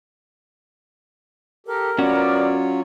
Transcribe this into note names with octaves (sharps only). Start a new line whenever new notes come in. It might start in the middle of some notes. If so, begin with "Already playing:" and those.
G4 A4 A#4
F#3 B3 C#4 F4 F#4 C#5 D5